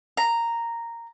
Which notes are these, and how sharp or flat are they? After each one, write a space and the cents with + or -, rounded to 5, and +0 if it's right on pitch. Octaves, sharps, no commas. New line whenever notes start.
A#5 -5